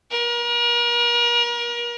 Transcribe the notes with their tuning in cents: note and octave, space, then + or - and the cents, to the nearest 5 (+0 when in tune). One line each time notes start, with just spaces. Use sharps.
A#4 +40